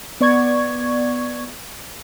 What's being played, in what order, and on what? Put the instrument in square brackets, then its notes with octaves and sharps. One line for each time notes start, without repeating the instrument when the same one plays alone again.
[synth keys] B3 D5 C#6 G#6